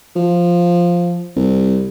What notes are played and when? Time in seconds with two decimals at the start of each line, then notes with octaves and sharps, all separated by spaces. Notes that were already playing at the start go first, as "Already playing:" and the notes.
0.16 F3
1.36 C2